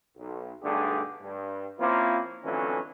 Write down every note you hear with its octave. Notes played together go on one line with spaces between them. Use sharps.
B1
B1 G2 D3 A3 G4 G#4
G2
F3 A#3 C4 C#4 E4 F4
F2 D3 E3 F#3 A3 C#4